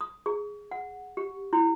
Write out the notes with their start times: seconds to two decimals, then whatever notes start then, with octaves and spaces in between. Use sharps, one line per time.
0.01 D#6
0.26 G#4
0.71 F#5
1.17 G4
1.53 E4